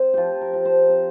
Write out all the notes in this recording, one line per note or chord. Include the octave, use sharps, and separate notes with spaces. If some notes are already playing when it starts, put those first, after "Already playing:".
Already playing: C4 C5
F3 F4 G4
A#4
F3
C5
C4